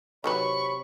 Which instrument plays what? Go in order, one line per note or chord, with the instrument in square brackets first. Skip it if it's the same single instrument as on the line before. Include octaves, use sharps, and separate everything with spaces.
[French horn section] C3 C#5 [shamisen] D#3 F#3 B4 [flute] B5 [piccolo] C#6